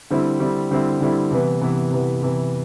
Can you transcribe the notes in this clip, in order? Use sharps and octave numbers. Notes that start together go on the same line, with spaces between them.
D3 G3 C4 E4
D3 G3 C4 E4
D3 G3 C4 E4
D3 G3 C4 E4
C3 E3 B3
C3 E3 B3
C3 E3 B3
C3 E3 B3